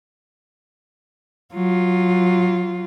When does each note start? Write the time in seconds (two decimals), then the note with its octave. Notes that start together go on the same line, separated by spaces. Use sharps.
1.54 F#3 F4